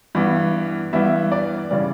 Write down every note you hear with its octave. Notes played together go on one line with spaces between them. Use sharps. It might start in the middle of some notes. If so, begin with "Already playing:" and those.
G2 E3 B3
G2 E3 B3 E5
D5
C#3 E3 G3 D5